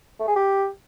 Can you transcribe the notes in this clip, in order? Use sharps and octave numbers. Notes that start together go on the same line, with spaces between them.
A3
G#4
G4